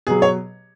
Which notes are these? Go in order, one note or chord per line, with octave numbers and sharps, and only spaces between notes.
B2 F#3 G#4
C#5